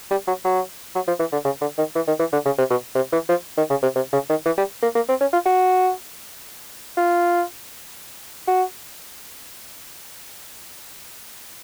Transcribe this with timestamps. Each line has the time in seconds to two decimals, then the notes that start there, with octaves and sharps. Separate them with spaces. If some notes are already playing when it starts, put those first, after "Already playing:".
0.11 G3
0.27 F#3
0.44 F#3
0.95 F#3
1.07 F3
1.19 E3
1.32 D3
1.45 C#3
1.61 D3
1.78 D#3
1.95 E3
2.07 D#3
2.19 E3
2.33 D3
2.45 C#3
2.58 C3
2.70 B2
2.95 C3
3.12 E3
3.29 F3
3.57 D#3
3.70 C#3
3.82 C3
3.96 C3
4.13 C#3
4.29 D#3
4.45 E3
4.58 G3
4.83 A#3
4.95 A#3
5.09 C4
5.21 C#4
5.33 F4
5.45 F#4
6.97 F4
8.47 F#4